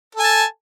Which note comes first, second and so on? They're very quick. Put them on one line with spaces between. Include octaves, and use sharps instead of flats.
A4 G#5 A5